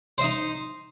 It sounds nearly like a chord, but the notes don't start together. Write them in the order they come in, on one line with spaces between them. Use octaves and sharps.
C5 D#5 D#4